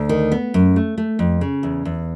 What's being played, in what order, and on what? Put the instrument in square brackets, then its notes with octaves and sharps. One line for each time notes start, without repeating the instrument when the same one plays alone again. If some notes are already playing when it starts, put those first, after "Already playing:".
Already playing: [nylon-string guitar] D2
D#3
B3
F#2
A3
A3
F2
C#3
E2
E2